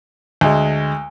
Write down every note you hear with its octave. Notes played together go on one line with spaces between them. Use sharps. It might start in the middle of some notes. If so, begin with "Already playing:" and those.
D2 G#3